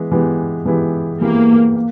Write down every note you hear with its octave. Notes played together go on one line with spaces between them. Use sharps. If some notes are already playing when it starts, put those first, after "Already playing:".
Already playing: E3 G#3 B3 E4
E3 G#3 B3 E4 G4
E3 G#3 B3 E4 G4
E3 G#3 A#3 B3 E4 G4
A#3